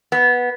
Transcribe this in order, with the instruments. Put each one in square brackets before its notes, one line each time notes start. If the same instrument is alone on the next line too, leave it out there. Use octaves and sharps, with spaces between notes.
[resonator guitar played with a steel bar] B3